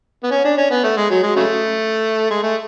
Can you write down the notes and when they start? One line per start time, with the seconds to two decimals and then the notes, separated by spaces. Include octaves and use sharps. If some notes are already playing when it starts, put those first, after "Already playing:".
0.23 B3
0.31 C#4
0.44 D4
0.58 C#4
0.71 B3
0.84 A3
0.97 G#3
1.10 F#3
1.23 G#3
1.36 C#3 F#3 A3
2.31 G#3
2.43 A3